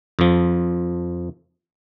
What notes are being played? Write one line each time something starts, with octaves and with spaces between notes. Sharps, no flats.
F2 F3